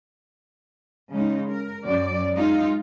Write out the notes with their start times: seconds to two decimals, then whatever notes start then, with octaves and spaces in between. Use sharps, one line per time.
1.12 C#3 G#3 D#4
1.50 A#4
1.84 F#2 D5
2.33 G#3 D#4 F4